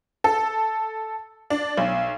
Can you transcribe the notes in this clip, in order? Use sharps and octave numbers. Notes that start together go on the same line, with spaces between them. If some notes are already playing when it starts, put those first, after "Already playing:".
A4
D4
B1